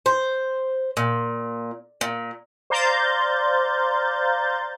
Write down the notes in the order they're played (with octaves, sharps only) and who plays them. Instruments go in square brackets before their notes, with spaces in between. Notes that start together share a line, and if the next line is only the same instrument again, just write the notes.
[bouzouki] C5
A#2
A#2
[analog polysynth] C5 D5 F5 A#5 G6 A6